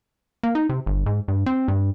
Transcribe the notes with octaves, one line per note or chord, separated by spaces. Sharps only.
A#3
D#4
C3
G1
G#2
G2
C4
G2